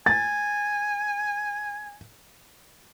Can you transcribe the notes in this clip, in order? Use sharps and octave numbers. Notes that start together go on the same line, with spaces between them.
G#5 A6